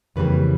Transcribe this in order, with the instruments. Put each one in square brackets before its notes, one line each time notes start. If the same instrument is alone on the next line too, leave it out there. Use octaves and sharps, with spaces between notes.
[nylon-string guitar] F2 C#3 E3 G3 A#3 B4